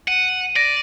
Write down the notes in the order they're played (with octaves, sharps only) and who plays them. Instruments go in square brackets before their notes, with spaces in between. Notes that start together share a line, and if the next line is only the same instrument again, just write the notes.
[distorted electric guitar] F#5 [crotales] D#7
[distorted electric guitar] D5 [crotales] A#6